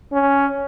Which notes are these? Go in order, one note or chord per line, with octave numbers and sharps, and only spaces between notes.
C#4